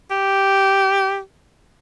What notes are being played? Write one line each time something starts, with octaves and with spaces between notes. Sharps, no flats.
G4